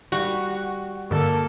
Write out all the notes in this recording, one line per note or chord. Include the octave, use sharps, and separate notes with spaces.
G3 F#4
G2 D3 A#3 A4